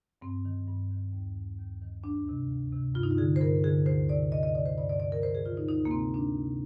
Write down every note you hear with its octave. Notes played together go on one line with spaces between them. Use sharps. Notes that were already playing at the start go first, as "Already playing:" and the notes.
G2 C4
D#3
G2
D#3
D#2
D#3
D#2
D#3
D2 D4
C3 D#3
D2
C3 D#3
G2 F4
D#4
F4
D3 G#4
C5
G2 A#4
D3 G#4
D2 C5
C3 D#3 D5
D2 D#5
D#5
C3 D#3 D5
C5
G2 D5
D5
D#3 D5
A#4
G2 C5
G#4
D#3 F4
D#4
D2 D#4
A#3
C3 D#3 C4
D2 D4
C3 D#3